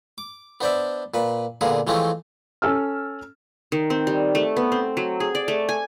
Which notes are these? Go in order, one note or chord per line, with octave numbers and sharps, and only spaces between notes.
D6
B3 D4 C5 D5 E5
A#2 B4
A#2 D3 B3 F4 G#4
E3 F3 G#3 A3 C4 C#4
C#4 A4 E6 F6
D#3
C4
G3
A3
B3
C4
F#3
G#4
D5
A3
G#5